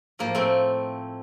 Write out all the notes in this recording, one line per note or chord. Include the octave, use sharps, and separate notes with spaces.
A2 F3 A#3
A3 C4